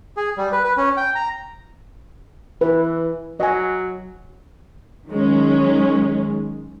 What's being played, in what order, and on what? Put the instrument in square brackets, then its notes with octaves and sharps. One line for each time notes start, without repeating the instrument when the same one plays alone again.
[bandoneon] G#4
G3
B4
B4
C#4
G5
A#5
[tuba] E3 [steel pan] B4
[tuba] F#3 [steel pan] D#5 G#5
[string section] D#3 F#3 G#3 C#4